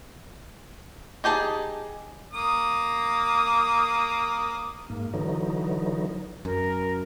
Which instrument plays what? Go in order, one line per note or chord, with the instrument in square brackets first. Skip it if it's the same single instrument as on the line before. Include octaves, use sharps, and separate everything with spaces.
[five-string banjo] D#4 G4 G#4 A5
[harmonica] A#3 D#6
[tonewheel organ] G#2 A#3
D3 E3 F#3 D#4
[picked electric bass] F#2 [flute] A#4